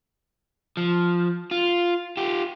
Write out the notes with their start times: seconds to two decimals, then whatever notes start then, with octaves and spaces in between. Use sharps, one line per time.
0.77 F3
1.51 F4
2.17 F4 G4